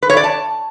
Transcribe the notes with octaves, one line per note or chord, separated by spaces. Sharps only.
B4
C#5
D5
A5